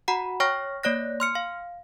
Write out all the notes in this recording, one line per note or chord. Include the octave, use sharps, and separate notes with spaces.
F#4 F#5 A#5 B5
C#5 G5 C#6 F6 A#6
A#3 C#5 D5 F#6 A#6
C6 F6 C#7
F5